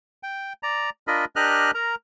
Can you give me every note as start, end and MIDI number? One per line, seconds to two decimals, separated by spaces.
0.23 0.53 79
0.63 0.90 74
0.63 0.90 82
1.08 1.25 62
1.08 1.25 65
1.08 1.25 70
1.08 1.25 75
1.08 1.25 83
1.36 1.71 62
1.36 1.71 67
1.36 1.71 70
1.36 1.71 75
1.36 1.71 89
1.36 1.71 90
1.74 1.95 70
1.74 1.95 82